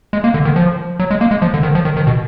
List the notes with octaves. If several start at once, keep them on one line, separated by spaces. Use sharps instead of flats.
G#3
A#3
D3
D#3
F3
F#3
G#3
A#3
G#3
F3
D3
D#3
F3
D#3
D#3
B2